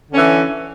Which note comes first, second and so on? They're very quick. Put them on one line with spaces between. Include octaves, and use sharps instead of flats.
D3 C#4 E3